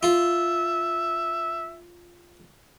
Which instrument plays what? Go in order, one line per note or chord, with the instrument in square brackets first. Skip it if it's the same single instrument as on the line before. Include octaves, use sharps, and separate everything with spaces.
[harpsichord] F4 [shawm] E5